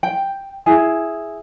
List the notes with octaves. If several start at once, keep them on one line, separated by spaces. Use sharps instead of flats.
G5
E4 G#4 G#5